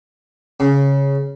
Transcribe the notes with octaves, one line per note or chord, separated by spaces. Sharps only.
C#3